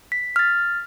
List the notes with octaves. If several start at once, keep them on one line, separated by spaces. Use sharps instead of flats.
B6
F6 A6